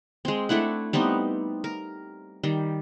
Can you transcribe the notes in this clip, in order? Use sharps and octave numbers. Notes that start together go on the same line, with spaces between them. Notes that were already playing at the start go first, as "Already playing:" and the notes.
G#3 C4
A3 D4 E4 F#5
G3 B3 C4 D#4
A#4
D#3 G3